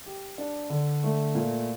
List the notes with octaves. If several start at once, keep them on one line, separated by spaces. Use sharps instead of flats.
G4
D4
D3
A3
A#2